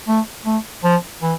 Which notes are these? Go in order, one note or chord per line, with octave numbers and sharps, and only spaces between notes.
A3
A3
F3
E3